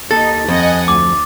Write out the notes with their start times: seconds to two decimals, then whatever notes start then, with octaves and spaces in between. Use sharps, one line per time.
0.11 D#2 D#4 A4 A6
0.48 F2 D#5 F#5 G#5
0.88 D2 D6